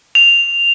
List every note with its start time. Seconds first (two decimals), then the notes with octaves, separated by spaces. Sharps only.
0.15 F7